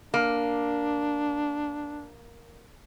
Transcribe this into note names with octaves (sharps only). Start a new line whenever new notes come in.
A#3 D4